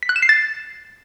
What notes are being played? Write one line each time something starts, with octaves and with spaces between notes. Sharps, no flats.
B6
F#6
E7
C7
A6